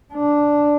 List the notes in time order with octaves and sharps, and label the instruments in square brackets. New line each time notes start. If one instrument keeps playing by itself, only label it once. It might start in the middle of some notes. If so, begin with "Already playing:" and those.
[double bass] D4